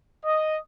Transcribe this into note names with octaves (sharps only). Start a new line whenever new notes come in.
D#5